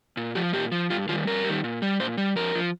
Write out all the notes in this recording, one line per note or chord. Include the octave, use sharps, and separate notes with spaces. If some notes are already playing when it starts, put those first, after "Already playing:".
A#2
F3 G4
A#2 G4
F3
G2 F4
D#3 G3 F4
G2 A#4
G3
D#3
A#2
G3
A#2 C5
G3
F2 A#4
F3